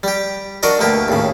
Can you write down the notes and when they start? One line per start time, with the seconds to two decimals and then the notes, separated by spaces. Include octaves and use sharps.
0.03 G3 G4
0.63 D4 F#4 A#4 D5 D#5
0.79 D2 B2 D3 A#3 G4
1.08 D#2 A2 C#3